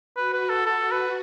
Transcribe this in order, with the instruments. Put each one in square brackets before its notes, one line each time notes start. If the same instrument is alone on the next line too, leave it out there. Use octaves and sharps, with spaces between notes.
[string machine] F#4 [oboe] B4
[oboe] B4
A4
A4
B4